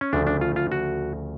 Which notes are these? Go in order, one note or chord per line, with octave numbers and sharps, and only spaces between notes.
C#4
D2 C#3 F3 A3 D4
D4
F4
F4
F#4